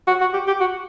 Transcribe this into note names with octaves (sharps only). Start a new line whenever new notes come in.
F#4
F#4
G4
G4
F#4